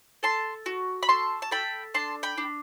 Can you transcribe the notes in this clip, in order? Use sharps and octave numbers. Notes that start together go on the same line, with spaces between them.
A4 A5 C6
F#4
B5
A4 A5 C6
A5
A4 G5 B5
D4 A5 C6
G5 B5
D4